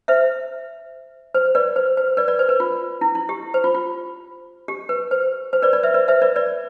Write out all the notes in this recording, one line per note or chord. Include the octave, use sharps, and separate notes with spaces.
C5 E5
C5
B4 D5
C5
C5
B4 D5
B4 D5
C5
B4
F4
E4
E4
G4
C5
F4
F4
G4
B4
C5
C5
B4 D5
B4 D5
C5 E5
B4 D5
C5 E5
B4 D5
B4 D5